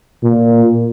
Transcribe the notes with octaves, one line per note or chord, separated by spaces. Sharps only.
A#2